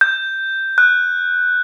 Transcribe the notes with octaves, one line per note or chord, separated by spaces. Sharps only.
G6
F#6